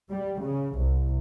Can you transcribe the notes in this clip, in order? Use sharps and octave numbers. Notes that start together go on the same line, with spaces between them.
G3
C#3
C2